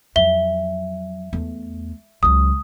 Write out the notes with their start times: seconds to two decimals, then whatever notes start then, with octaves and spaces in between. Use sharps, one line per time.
0.16 F2 F#3 E5 G7
1.33 E2 A3
2.23 C#2 F#3 D#6